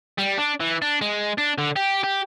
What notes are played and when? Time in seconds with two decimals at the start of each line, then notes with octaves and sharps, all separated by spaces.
0.18 G3
0.38 D4
0.60 E3
0.82 D4
1.01 G#3
1.38 D4
1.58 D3
1.76 G4
2.04 G4